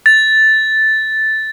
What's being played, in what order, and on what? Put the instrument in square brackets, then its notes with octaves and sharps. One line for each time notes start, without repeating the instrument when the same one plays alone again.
[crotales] A6